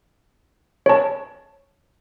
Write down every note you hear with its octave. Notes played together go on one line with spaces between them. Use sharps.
C#5 A5